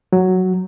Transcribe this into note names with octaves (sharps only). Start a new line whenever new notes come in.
F#3